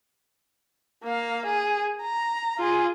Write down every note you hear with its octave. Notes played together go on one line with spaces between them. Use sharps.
A#3 F5
G#4
A#5
F4 G#4